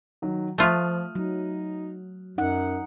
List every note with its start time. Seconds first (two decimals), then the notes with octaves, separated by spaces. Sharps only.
0.22 D#3 F#3
0.58 F3 A3 F4 D#6 F6 F#6
1.15 F#3 D#4
2.38 F#2 D#4 F#5